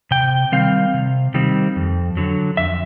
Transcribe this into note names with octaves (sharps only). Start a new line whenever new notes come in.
C3 G5
D#3 G3 C4 F5
C3
D#3 G3 C4
F2
D3 F#3
F2 E5